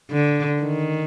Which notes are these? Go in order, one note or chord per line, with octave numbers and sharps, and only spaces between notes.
D3
D#3